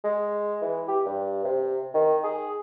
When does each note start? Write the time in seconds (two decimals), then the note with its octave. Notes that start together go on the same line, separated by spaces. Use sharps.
0.04 G#3
0.62 E3
0.88 G4
1.06 G2
1.44 C3
1.94 D#3
2.24 G#4